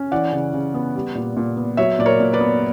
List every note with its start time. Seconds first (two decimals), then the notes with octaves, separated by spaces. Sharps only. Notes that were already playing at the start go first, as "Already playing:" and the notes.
Already playing: C#4
0.12 E3 D5 F#5
0.32 C#3
0.54 C#3
0.74 B3
0.95 G3
1.15 A#2
1.37 A#2
1.57 B3
1.77 F#3 C#5 E5
1.99 A#2 D5
2.06 A#4 C#5
2.20 A#2
2.33 B4 D5
2.41 B3